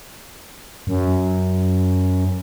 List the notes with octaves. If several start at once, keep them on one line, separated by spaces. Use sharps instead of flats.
F#2